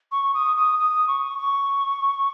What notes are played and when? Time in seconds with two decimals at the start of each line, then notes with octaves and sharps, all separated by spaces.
0.12 C#6
0.34 D#6
0.56 D#6
0.79 D#6
1.08 C#6
1.38 C#6